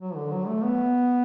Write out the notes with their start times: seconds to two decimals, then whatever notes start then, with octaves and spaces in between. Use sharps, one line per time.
0.01 F#3
0.16 D3
0.32 F#3
0.47 A3
0.63 B3